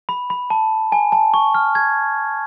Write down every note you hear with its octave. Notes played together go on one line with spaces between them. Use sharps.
B5
B5
A5
G#5
A5
C#6
F6
G#6